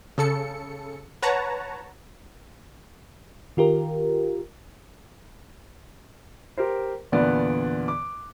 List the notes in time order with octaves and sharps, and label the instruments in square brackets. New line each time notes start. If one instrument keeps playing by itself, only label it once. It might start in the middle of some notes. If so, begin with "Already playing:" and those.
[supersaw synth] C#3 A4 C#7
B4 C#5 F#5 A5 A#5
[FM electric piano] D#3 F4 G4 A#4
[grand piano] G4 A#4 C5
E2 A#2 D3 B3 D5 F#6
D6